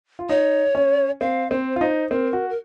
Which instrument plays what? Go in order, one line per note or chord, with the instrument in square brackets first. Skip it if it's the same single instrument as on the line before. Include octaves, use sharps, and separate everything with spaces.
[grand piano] F4
[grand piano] D#4 [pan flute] C#5
[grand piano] C#4
[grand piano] C4 [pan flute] F5
[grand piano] C4 [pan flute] C5
[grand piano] F4
[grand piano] D#4 [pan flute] C5
[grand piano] C4 [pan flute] A#4
[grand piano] F#4
[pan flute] A#4